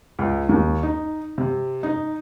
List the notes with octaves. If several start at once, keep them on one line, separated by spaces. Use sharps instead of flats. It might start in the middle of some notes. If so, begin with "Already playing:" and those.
C#2
D#2
D#4
C3
D#4